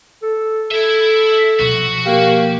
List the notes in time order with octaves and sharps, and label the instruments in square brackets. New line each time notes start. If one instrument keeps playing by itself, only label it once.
[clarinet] A4
[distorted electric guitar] E4 E5 [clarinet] A4
[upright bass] B2 F3 [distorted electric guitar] F#4
[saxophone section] A#3 G4 [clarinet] F5